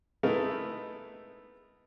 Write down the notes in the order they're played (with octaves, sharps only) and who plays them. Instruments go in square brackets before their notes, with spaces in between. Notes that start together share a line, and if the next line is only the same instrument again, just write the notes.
[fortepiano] G#3 A3 B3 D#4 E4 A#4